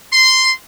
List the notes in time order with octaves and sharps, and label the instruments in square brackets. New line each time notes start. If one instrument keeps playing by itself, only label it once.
[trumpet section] C6